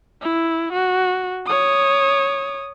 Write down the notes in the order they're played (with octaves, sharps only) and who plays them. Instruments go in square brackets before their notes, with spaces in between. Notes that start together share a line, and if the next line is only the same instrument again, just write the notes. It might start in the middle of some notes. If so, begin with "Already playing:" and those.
[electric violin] E4
F#4
C#5 D#6